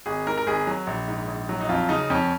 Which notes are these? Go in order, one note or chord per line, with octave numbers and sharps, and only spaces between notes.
G#1 G#4
G#2 A#4
A#4
G#1 G#4
F#3
A#1
G#2
A#1
F#3
D#4
F2 F4
C#3 D#4
F2 C#4